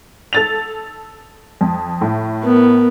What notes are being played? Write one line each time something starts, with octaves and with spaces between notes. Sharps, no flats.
A4 A6 F7
F2
A2
B3 A#4